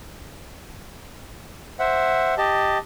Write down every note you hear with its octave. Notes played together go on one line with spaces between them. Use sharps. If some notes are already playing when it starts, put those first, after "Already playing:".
C5 E5 F#5
G4 D#5 A5